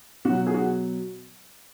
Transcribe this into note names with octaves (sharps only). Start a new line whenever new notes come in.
B2 F#3 F#4
G#4
F#4